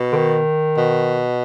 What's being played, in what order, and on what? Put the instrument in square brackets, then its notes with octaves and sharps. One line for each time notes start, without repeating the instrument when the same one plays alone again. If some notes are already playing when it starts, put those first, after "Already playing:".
Already playing: [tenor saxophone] B2
[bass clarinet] D3
D#3
[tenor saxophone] B2